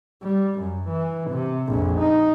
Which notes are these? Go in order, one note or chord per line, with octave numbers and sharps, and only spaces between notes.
G3
F#2
E3
C3
A#1 F2
D#4